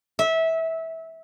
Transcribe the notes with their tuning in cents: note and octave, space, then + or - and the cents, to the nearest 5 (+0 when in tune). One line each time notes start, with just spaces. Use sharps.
E5 -20